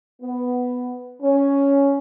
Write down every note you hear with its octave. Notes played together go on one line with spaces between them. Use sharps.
B3
C#4